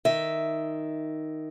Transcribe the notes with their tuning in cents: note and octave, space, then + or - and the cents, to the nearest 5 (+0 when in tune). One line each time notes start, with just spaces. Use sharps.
D#3 +0 E5 +0